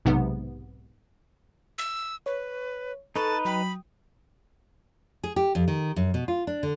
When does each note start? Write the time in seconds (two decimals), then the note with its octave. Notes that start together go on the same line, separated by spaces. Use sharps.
0.05 B1 G#2 C3 B3
1.78 E6
2.26 B4 C#5
3.16 D#4 A4 B4 A5 C#6 F#6
3.45 F#3 G5 B5 D#6
5.24 G#4
5.36 G4
5.55 F2
5.68 D#3
5.96 F#2
6.14 B2
6.28 F4
6.47 D4
6.63 D3